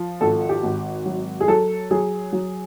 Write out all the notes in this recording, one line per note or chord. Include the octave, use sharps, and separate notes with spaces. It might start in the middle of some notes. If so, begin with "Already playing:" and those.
Already playing: F3
G#1 A4
G4
G#1
F#3
G#4
F#3 A4
F#3 G#4
F#3